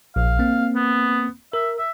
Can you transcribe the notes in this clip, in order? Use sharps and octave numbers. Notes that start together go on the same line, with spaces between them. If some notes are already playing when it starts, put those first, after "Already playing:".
A#1 F5
A#3 C4
B3
A#4 E5
E5